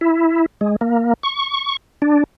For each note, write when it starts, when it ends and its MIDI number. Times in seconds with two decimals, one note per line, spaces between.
0.01 0.46 64
0.61 0.76 56
0.81 1.14 58
1.23 1.77 85
2.02 2.24 62